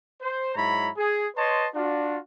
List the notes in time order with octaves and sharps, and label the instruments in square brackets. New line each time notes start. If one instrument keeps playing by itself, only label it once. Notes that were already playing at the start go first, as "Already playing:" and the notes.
[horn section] C5
G#2 F#3 E4 C#5 A#5 B5
G#4
B4 C#5 D#5 A5 C6
D4 F4 F#4